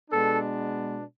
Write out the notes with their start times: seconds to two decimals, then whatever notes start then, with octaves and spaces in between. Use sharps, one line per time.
0.11 B2 G#3 B3 D4 A4